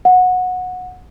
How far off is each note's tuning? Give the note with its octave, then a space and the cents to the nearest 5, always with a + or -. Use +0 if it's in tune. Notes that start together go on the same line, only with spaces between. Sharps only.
F#5 -15